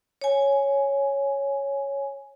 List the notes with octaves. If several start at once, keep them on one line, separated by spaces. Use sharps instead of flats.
C#5 G#5